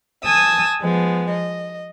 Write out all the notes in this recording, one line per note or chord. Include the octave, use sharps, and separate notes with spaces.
G#5 A5 D#6 E6
F3 G#3 B3
D#5